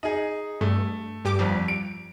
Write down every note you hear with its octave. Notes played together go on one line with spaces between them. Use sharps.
D#4 G#4
G2 A3
G2 G4 D6
G1 F2 F3 G3
D7